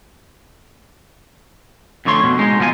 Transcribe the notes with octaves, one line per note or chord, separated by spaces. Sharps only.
F2 D3 A3 C#5 C6
B2
G#3 D#4
B2 F3 F4 D#5 G#5